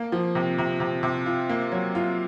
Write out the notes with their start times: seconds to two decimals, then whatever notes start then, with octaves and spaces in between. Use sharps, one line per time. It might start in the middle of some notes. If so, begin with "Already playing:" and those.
Already playing: A#3
0.12 F3
0.35 C3
0.58 C3
0.80 C3
1.03 C3
1.26 F4
1.49 A#3
1.72 F#3
1.95 F4